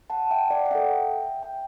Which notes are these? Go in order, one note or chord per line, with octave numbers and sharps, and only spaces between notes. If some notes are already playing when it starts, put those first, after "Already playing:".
F#5 A5
E5 G5
D5 F#5
F#5
D4 A4 E5 G5
G5